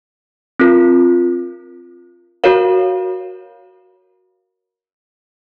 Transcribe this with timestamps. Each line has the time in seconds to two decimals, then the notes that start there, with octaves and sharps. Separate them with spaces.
0.60 C4 F4 A#4
2.44 F#4 A#4 C#5 F5